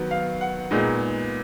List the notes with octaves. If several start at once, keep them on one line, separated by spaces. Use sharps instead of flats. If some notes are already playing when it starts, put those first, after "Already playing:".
Already playing: D#3 F#3 B3
F5
F#5
A#2 G#3 B3 D#4